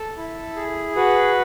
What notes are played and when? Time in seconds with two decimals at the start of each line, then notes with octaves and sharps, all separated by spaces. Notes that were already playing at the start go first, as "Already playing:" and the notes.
Already playing: A4
0.17 E4
0.56 G#4
0.96 F#4 B4